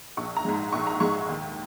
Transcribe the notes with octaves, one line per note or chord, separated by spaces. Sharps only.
A#1 C#6
A#5
G#2 G#3
A#5
A#1 C#6
A#5
G#2 G#3 C#6
D#2